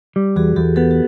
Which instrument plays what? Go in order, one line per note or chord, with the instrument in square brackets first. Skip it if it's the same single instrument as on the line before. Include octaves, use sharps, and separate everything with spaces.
[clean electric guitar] G3
[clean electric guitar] E2 [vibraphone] F#4 G#4
[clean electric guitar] E2 [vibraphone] G4 A4
[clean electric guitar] B3 [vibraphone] G4 A4
[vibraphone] G4